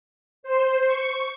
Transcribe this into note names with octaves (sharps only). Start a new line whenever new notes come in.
C5
C#6